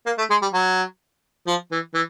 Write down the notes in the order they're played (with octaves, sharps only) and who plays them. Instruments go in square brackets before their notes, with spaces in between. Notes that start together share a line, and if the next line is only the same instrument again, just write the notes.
[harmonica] A#3
A3
G#3
G3
F#3
F3
E3
E3